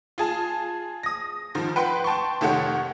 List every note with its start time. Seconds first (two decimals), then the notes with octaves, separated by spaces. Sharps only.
0.18 F4 G#4 A5
1.03 D#6 A#6
1.55 G#2 D#3 F3
1.76 B4 F#5 G5 B5 C6
2.04 G5 A5 C6 C#6
2.41 F1 D#3 A3 G4 C#5 F#5